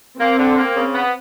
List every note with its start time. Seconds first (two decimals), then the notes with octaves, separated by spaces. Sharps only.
0.19 A#3 C4
0.37 D3
0.56 A#3
0.75 C#3
0.94 B3